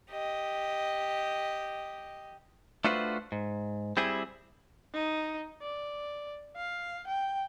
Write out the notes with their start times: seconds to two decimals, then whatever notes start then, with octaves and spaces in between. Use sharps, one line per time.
0.11 G4 D#5
2.84 A3 D4 F4 F#4 B4 C5
3.32 G#2
3.97 G3 C4 E4 G#4
4.94 D#4
5.62 D5
6.57 F5
7.07 G5